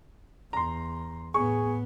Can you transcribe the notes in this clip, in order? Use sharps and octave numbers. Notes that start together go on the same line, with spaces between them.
E2 A#5 C6
A2 B3 G#4 C#6